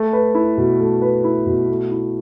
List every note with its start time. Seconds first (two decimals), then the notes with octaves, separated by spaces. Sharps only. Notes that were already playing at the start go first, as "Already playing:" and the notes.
Already playing: A3
0.13 B4
0.35 E4
0.57 B2
0.80 A3
1.02 B4
1.24 E4
1.46 B2
1.69 A3
1.91 E4